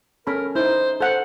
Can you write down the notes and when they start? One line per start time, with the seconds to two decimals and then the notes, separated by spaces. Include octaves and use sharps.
0.27 C#4 A4 A#4 B5
0.55 D#4 E4 C5
1.01 A4 C5 F#5